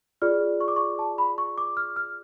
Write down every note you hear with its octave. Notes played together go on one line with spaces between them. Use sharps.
F4 G#4 D5 F6
C#6
D6
C#6
A5
B5
C#6
D6
F6
F6